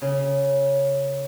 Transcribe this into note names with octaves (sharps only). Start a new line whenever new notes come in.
C#3